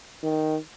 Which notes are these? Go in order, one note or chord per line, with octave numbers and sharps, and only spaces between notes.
D#3